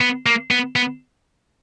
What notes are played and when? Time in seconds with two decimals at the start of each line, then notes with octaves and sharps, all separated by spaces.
0.01 B3
0.26 A#3
0.51 B3
0.76 B3